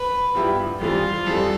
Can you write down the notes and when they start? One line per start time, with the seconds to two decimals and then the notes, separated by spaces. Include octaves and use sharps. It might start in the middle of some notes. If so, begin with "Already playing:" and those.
Already playing: B4
0.34 G2 F3 B3 E4 G4
0.80 F2 E3 G3 F4
1.26 F2 E3 G3 A4